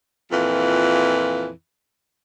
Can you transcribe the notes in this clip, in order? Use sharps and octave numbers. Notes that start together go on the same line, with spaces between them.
F2 A#2 E3